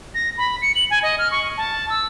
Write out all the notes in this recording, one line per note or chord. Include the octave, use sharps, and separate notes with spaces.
A#6
B5
C#7
F#7
G#5
D#5
F6
C#6
A5
E6